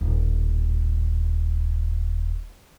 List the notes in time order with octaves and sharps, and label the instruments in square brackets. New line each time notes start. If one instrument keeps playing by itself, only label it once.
[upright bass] D#1 A2